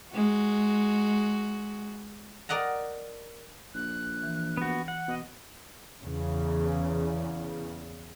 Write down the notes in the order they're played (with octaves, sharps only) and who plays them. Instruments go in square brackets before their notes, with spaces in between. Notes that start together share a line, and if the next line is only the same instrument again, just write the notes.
[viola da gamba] G#3 F#4
[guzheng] A#4 D5 D#5 F#5 A#5
[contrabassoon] A#1 [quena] F#6
[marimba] E3
[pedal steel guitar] B3 F#4
F#5
[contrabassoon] B2 [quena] D#5
[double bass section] E2 C#3